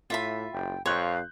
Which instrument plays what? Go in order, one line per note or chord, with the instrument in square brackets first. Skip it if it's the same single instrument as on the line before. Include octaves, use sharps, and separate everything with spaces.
[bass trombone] A2 [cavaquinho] F4 E5 B5
[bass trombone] F#1 [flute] G5
[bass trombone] F2 [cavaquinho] C#5 [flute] F5 [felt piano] C6 F#6 G6